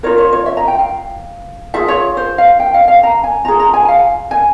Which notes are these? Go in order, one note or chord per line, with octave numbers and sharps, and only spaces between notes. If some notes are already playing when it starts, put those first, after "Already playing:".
F4 A#4 C#5
C#5
C#5
E5
A#5
G5
F5
F4 G#4 E5
C#5
C5
F5
G5
F5
F5
A#5
G#5
F4 G#4 A#5
A#5
G#5
F5
G#5